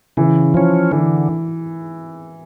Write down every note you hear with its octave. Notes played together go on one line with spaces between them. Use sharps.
C#3 E3
F3 C#4
D3 E3